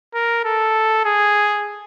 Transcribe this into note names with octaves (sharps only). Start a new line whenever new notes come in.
A#4
A4
G#4